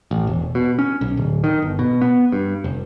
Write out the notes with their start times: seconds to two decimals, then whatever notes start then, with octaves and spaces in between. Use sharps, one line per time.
0.11 A1
0.27 E1
0.55 B2
0.79 C#4
1.01 B1
1.17 D1
1.44 D#3
1.62 G1
1.79 B2
2.01 B3
2.32 G2
2.64 F1